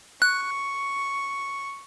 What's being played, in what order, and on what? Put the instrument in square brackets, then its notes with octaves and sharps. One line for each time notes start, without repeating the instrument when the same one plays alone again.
[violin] C#6 [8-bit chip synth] F#6